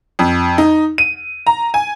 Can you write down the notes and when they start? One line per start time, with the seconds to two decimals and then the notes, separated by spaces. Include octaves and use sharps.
0.19 F2
0.58 D#4
0.98 D#7
1.47 A#5
1.74 G#5